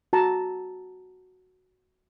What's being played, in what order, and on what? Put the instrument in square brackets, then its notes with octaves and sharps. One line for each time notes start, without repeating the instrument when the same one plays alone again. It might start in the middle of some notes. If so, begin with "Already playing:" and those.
[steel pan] F#4 A5 A#5